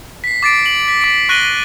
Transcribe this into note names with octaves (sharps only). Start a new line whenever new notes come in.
B6 C7
D6 A6 C7 D7
D7 F#7
B6
D6 B6 D7
C#6 F#6 A#6 D#7 F#7 G7